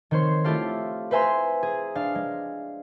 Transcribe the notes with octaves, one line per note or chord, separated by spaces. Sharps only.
D#3 C4 C5 C#5 C6
A3 E4 F4 G4 A4 F5
B4 C5 E5 G#5 A#5 C6
G#4
D4 F5
G#3